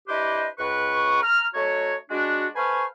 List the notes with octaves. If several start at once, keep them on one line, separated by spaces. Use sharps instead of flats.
D4 E4 G4 B4 C5 D#5
C#2 B4 C#6
A#5 F6
A3 D#4 F#4 C#5
G#3 D4 F#4
A4 B4 C5 F5 G#5 C#6